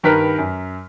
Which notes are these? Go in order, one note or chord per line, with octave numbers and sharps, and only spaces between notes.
G2 D#3 A#4 B4 F6 B6
F#2